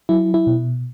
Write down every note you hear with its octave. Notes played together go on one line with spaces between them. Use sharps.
F#3 E4
E4
B2